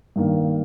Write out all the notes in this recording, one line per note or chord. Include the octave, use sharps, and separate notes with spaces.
G2 D#3 A#3